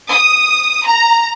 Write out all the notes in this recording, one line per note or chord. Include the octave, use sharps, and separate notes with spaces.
D#6
A#5